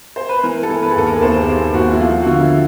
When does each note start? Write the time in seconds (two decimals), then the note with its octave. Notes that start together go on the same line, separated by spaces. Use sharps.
0.16 C5
0.29 B4
0.43 E3 A#4
0.63 A4
0.69 E3
0.82 B4
0.91 G#4
0.96 D#2 A4
1.06 A#4
1.14 B4
1.22 D#2 C5
1.37 G#4
1.48 D#2 G4
1.73 D#2 F#4
1.91 E4
2.00 F3 F4
2.22 F#4
2.26 D3 F4
2.39 E4